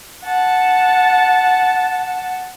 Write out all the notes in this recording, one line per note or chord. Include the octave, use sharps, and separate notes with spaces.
F#5 A5